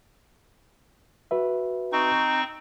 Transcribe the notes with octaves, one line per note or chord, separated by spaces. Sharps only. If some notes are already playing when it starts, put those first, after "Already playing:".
F#4 B4 E5
C4 D#4 C#6